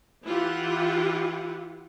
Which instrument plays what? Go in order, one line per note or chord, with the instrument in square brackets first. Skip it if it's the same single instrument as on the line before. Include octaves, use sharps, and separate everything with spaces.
[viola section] E3 E4 F4 G4 F#5